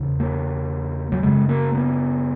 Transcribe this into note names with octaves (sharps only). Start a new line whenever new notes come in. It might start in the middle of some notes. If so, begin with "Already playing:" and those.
Already playing: E2 C#3
A#3
F#3
F#2 C#3 G#3
A#3
B3